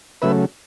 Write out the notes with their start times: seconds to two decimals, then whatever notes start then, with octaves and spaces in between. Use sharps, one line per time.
0.22 C#3 F#3 A3 B4 E5